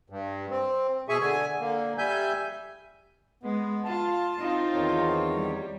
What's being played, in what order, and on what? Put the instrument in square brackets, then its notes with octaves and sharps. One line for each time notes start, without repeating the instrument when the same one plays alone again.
[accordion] G2
C4
B2 G#4 E5 G#5 C#6
D3 G#5
D3 A#3
G3 E5 G#5 G6
[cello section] G#3 [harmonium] B3
[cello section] F4 [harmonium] A5
[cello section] C4 D#4 F4
[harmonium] E2 D#3 C#5
[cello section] G3